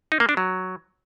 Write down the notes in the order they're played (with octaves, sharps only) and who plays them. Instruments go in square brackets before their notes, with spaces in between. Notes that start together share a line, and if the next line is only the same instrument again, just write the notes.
[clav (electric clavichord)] D#4
A#3
D4
F#3